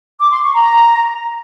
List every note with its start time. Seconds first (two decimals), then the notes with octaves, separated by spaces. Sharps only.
0.20 D6
0.31 C6
0.42 C#6
0.53 A#5